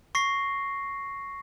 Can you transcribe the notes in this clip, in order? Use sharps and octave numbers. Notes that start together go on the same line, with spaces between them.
C#6 A#6 C7